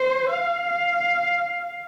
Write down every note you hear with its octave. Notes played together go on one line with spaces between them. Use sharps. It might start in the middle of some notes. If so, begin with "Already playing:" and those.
Already playing: C5
F5